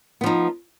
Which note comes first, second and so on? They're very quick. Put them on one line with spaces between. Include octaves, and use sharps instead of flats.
B3 F3 D#4